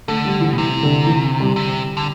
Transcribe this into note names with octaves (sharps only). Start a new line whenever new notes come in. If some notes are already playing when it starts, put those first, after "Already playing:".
D3 A3
G3
E3
B2
C3 E3
D3
E3
G3
C3
D3